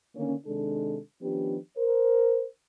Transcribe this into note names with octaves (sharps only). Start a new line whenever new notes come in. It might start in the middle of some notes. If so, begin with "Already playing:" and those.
D3 D#3 A#3 C#4
C3 D#3 G#3 D4 A4
D#3 F3 B3 C#4 D4 G4
A#4 C5